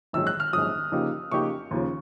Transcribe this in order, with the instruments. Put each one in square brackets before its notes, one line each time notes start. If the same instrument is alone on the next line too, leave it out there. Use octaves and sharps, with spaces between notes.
[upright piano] A#1 G#2 D#3 F#3 [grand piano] E6
[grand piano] F#6
F6
[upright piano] A#1 G#2 D#3 F#3 [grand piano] D#6
[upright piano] C#3 F3 A#3 D#4 G4
[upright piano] C#3 F3 A#3 D#4 G4 [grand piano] C#6
[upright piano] D#2 C#3 F3